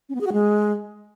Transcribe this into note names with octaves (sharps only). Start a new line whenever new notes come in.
C#4
B3
G#4
F#4
G#3